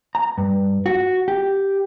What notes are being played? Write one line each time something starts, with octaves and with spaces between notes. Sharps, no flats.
A#5
G2
F#4
G4